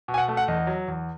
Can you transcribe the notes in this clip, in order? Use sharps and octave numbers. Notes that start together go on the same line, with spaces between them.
B2
G#5
F#5
A3
F#5
E2 D#5
F#3
E2